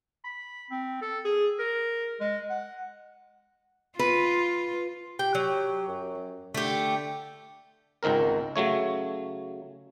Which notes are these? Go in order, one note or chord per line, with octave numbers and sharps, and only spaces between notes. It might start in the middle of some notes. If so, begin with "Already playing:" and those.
B5
C4
A4
G#4
A#4
G#3
F#5
F4 B4
G4 G5
F#3
F#2
D3 A3 G4
G#1 C#2 D#3 C4 A#4
C#3 F#3 A3 C#5